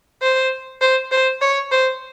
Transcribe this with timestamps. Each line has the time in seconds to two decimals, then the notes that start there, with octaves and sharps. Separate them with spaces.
0.22 C5
0.81 C5
1.12 C5
1.42 C#5
1.71 C5